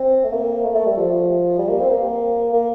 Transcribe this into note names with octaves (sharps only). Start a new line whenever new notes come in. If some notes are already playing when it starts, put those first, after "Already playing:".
Already playing: C4
A3
A#3
A3
A3
G3
F3
G3
A#3
C4
A#3
A#3